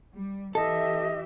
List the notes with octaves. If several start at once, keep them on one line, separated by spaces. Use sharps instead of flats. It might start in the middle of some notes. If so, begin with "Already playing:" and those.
G3
E3 G4 A4 D#5 E5